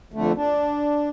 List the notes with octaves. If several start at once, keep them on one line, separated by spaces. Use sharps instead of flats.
F2 D3 A3
D4